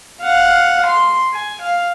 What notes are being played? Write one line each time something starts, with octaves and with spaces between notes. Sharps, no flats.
F5 F#5
C6
G#5
F5